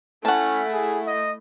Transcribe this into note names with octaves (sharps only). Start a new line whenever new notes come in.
A3 C#4 E4 F#5 A5
G#4
D#5